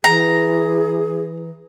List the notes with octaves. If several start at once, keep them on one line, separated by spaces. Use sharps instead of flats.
E3 G#4 A#5